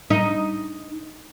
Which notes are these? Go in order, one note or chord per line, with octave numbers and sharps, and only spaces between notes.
D#4